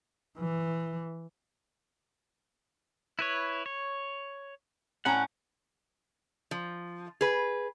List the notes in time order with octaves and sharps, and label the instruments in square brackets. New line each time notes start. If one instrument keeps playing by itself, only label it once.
[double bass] E3
[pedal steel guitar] E4 B4 C#5
C#5
[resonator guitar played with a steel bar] A2 C#4 A#5 [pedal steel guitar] F#5
[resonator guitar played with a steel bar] F3
G#4 B4